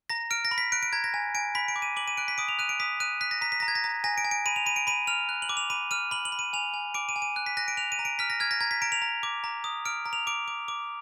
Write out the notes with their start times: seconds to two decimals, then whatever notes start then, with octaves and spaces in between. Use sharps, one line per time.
0.10 A#5 A#6
0.31 F6 D7
0.45 A#6
0.51 B5
0.58 B6
0.72 F#6 D7
0.83 D7
0.93 A#5 G#6
1.04 A#6
1.14 G#5
1.35 G#5 D7
1.55 B5 B6
1.68 D7
1.76 D6
1.82 D#7
1.96 D6 F#7
2.08 D#7
2.17 F#6 D7
2.28 B6
2.38 D#6 D7
2.48 F7
2.59 F#6 D#7
2.69 D7
2.80 D#6 B6
3.00 F#6 D#7
3.21 F#6 B6
3.31 A#6
3.41 A#5 B6
3.52 B6
3.60 A#5 A#6
3.68 G#6
3.75 A#6
3.84 A#5
4.04 G#5 A#6
4.18 D7
4.25 G#5
4.31 D7
4.46 B5 D#7
4.56 F7
4.66 B5 D#7
4.76 D7
4.87 B5 D#7
5.07 F6 F7
5.29 F#6
5.42 F#7
5.49 D6
5.57 F7
5.70 B5 D#7
5.91 F6 D#7
6.11 B5 F#7
6.25 F#7
6.32 B5
6.39 D#7
6.53 G#5 F7
6.74 G#5
6.94 D6 D7
7.09 D#7
7.16 G#5
7.22 D#7
7.36 F#6
7.46 B6
7.57 F#6 A#6
7.68 D7
7.77 F#6 F7
7.92 D#7
7.99 A#5
8.05 D7
8.19 F6 B6
8.30 A#6
8.40 F6 G#6
8.51 A#6
8.61 A#5 G#6
8.71 B6
8.82 A#5 D7
8.92 F7
9.02 A#5
9.23 D6
9.44 A#5
9.64 D#6
9.85 F6 D7
10.06 A#5
10.13 F7
10.27 D6 D7
10.48 D6
10.68 D6